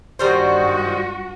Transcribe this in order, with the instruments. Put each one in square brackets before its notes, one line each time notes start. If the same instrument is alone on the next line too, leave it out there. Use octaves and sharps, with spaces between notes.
[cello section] G2 F#4 [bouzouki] D#3 G3 C5